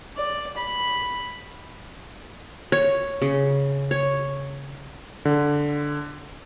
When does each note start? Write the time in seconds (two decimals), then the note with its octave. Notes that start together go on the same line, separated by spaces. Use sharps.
0.16 D5
0.57 B5
2.72 C#5
3.22 C#3
3.91 C#5
5.25 D3